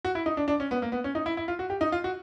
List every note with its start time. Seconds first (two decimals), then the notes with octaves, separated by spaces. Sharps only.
0.05 F#4
0.15 E4
0.26 D#4
0.37 D4
0.48 D4
0.60 C#4
0.71 B3
0.82 A#3
0.92 B3
1.04 C#4
1.15 D#4
1.26 E4
1.37 E4
1.48 F4
1.59 F#4
1.70 G4
1.81 D#4
1.92 F4
2.04 F#4